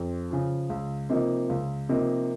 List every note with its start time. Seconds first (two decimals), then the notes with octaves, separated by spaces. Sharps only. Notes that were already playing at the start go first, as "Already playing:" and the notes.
Already playing: F2
0.30 C#3 F3
0.70 C#2
1.10 C3 F3 A#3 D#4
1.49 C#2
1.89 C3 F3 A#3 D#4